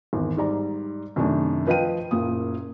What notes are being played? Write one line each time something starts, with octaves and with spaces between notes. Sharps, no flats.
G#1 E2
G#2 G3 D5 A#5
F#2 C3 D#3 A3 D4
F3 B4 D#5 F5 G5 D#7
F#1 A#2 A#3 D#6